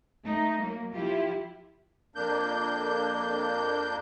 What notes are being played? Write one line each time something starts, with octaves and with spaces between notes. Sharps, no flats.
A3 D#4
F#3 A#3
F3 E4 F4 G4
F2 A#3 D4 G6